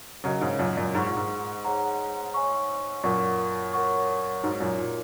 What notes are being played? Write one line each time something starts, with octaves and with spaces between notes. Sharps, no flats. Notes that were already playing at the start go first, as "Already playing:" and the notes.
C#3 F#3 F#4 A#4 D#5 F#5
G#2 C#3
F#2 A#2
F#2 A#2
G#2 G#4 F#5 C#6
A#2
G#2
G#4 C#5 F#5 A#5
C#5 G#5 C#6
F#2 A#2 A#4 F#5 C#6
A#4 C#5 F#5 C#6
G#2 D#4 F#4 C#5
F#2 A#2
A#2